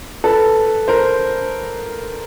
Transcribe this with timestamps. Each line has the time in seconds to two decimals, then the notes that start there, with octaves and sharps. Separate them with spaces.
0.24 A4 B4
0.88 A#4 C5